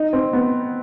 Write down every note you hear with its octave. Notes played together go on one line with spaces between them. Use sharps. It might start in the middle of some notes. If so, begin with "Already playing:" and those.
Already playing: D#4
C4
B3